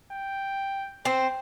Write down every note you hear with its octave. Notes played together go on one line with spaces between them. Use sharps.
G5
C4 C5